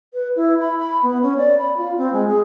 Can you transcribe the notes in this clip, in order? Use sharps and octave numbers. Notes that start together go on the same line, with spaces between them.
B4
E4
B5
B5
B3
C#4
D5
B5
F4
C4
G#3
G#4